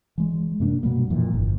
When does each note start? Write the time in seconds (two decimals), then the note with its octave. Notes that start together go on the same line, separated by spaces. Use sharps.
0.18 E3 G#3
0.60 F#2 C3 A#3 D4
0.83 B2 G3 A#3
1.10 F2 A#2 E3
1.34 G1